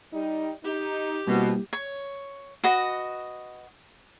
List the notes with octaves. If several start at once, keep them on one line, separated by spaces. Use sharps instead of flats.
G3 D#4
D#4 G4
B2 G3 A#3 C4 E4
C#5
F#4 B4 D#5